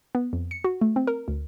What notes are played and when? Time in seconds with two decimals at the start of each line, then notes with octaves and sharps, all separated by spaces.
0.15 B3
0.33 F2
0.51 C#7
0.64 F#4
0.81 A3
0.96 C4
1.07 A#4
1.28 D2